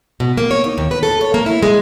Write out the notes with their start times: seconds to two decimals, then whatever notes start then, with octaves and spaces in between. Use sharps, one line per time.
0.20 B2
0.38 A#3
0.51 C#5
0.64 D#4
0.78 D#2
0.91 B4
1.03 A4
1.21 C#5
1.34 A#3
1.46 E4
1.63 G#3